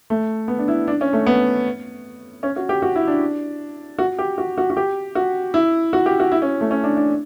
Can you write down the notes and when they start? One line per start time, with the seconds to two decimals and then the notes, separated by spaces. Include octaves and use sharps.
0.10 A3
0.48 B3
0.59 D4
0.68 E4
0.88 D4
1.01 C#4
1.13 A3
1.26 B3
2.43 C#4
2.56 F#4
2.69 G4
2.82 F#4
2.95 E4
3.07 D4
3.99 F#4
4.19 G4
4.38 F#4
4.58 F#4
4.70 F#4
4.77 G4
5.15 F#4
5.54 E4
5.93 F#4
6.06 G4
6.20 F#4
6.31 E4
6.42 C#4
6.61 A3
6.71 C#4
6.84 D4
6.97 D4